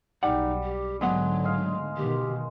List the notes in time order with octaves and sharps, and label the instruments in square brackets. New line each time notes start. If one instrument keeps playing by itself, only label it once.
[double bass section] B1 [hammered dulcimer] G3 [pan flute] D#4 [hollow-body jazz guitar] F#5
[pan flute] G4
[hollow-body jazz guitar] D2 B3 F#5 [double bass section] G#2 D3 [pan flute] F#3 [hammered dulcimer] G#3
[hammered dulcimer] G#3 F5
[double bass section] B2 D#3 [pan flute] G4